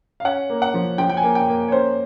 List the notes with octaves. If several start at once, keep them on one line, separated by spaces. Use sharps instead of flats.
F5
C#4 F#5
A#3
F#5
F3
F3 G5
G5
G#5
A#3
G5
A#3
C#5
C#4 C5